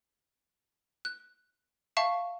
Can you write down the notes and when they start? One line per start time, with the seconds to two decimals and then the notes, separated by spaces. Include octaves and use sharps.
1.05 F#6
1.97 E5 F5 A5 C#6